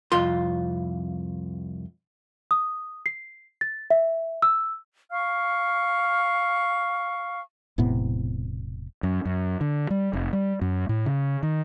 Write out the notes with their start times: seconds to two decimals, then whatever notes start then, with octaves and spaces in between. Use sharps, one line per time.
0.12 C2 F2 F4 C6
2.51 D#6
3.06 C7
3.61 A6
3.90 E5
4.42 E6
5.11 F5 C#6 F6
7.78 E1 A2 C3 B3
9.03 F#2
9.25 F#2
9.61 D3
9.90 G3
10.13 F1
10.33 G3
10.61 F#2
10.89 A2
11.06 C#3
11.43 D#3